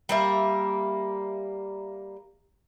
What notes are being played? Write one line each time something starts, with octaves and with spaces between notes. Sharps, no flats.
G3 A#3 E5